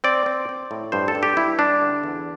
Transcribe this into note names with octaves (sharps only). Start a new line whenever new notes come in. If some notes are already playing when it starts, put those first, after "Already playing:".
C4 D5
C4
C4
A2
G2 C5
A4
G2
G4
G2 E4
G3 D4
D3
E2